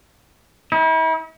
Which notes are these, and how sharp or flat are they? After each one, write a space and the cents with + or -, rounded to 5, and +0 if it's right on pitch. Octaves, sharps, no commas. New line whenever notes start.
E4 -40